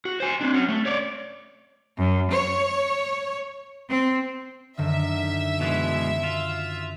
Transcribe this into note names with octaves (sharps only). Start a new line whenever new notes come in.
F#4
C5 G#5
C4 D4
C#4 F#4
A3
C#5 D5
F#2
C#5
C4
F#2 D3 D#3 E5
B2 E3 G#3 F#6 G#6 A6
F4